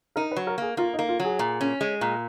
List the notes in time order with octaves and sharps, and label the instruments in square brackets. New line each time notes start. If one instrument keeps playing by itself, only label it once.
[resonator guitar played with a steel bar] D#4 [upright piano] A#4
[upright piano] B4
[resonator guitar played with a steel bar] F#3
[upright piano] A#4
[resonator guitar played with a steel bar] A#3 [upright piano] G#4
[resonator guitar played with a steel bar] A#3 [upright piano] F4
[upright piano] D#4
[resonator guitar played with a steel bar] A#3
[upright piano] F4
[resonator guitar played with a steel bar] F#3 [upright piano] G#4
[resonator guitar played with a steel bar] A#2
C#4
G#3
A#2